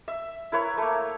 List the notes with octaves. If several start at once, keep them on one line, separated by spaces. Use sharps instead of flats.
E5
E4 A#4 B4 C#5
A3 A#3